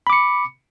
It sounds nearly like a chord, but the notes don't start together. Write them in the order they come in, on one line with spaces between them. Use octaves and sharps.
B5 D6 C#7